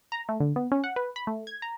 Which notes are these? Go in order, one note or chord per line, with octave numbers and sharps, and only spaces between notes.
A#5
A3
D3
B3
C#4
F#5
B4
B5
A3
G#6
A#5